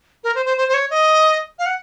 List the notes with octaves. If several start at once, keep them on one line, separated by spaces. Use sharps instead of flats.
A#4
C5
C5
C5
C5
C#5
D#5
F5
F#5